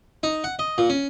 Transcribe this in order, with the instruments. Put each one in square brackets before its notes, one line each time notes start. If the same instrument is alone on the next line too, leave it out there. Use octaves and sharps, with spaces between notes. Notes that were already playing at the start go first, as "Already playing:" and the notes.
[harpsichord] D#4
F#5
D#5
A#2
C#4